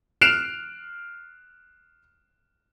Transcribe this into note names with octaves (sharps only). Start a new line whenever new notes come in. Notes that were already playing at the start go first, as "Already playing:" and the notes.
F6 F#6 C7 D7 E7 F7